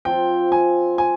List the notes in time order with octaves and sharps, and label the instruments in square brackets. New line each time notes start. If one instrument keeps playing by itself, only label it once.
[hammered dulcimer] F3 C4 F4 [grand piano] G5
[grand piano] G#5
G#5